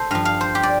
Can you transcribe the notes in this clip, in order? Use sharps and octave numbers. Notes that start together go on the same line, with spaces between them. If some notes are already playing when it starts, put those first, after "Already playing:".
Already playing: A4 C5
G2 F3 F5
F5
C5
G4
D5